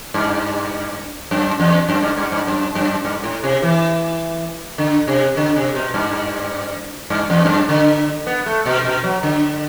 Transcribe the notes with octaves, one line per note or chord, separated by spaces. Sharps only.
G2
F#2
E2
F#2
G2
G2
G2
F#2
F#2
G2
A2
C3
E3
D3
C3
D3
C3
B2
G2
G2
E2
G2
F#2
D3
B3
A3
B2
B2
F#3
D3